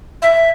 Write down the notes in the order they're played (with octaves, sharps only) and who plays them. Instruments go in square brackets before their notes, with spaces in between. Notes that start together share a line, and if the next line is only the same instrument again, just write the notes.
[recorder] E5